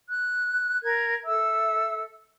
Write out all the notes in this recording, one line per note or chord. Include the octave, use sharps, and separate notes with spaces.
F#6
A#4 G#6
A4 E5 E6